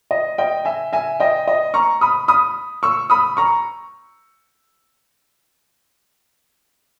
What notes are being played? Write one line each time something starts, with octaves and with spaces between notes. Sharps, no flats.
D#5
D#5 G5
E5 G#5
E5 G#5
D#5 G5
D#5
A#5 C#6
B5 D#6
B5 D#6
C#6 E6
B5 D#6
A#5 C#6